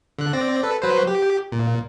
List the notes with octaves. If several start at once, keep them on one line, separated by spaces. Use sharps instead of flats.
D3 F#6
C4 D5 A#6
A4 B4
F#3 B4 C5
G4
A#2